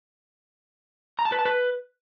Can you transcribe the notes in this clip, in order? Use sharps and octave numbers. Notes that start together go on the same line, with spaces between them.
A#5
A5
B4
A5
B4